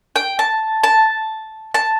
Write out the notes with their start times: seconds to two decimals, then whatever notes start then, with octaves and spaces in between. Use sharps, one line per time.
0.16 G5
0.39 A5
0.83 A5
1.74 A5